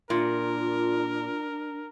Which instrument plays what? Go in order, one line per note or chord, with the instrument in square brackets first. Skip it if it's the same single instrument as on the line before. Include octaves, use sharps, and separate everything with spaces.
[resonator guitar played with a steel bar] A#2 [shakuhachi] D4 [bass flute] F4 [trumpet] A#4